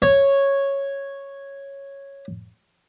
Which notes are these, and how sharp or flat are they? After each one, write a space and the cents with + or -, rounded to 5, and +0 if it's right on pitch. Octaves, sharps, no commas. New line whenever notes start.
C#5 -5